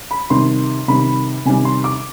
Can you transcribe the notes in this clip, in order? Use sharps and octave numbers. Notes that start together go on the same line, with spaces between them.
B5
C3 D#3 G3 C6
C3 D#3 G3 B5
C3 D#3 G3 G#5
C6
D6